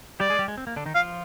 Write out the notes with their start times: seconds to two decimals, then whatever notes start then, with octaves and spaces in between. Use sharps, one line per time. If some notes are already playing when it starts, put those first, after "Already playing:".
0.20 G3 G4 D5
0.30 G#3 G#4
0.39 G3 G4
0.48 G#3
0.58 C4
0.67 A#3
0.76 D3 D4
0.86 D#3 D#4
0.95 F3 F4 F5